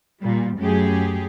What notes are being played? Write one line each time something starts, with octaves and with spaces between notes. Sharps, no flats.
A#2 G3
F#2 A3 G4 G#4